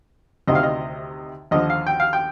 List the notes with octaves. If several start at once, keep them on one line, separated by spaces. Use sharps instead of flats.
D2 C3 D#3 D#5
F5
D#5
D#2 D3 F3 D#5
F5
G5
F5
G5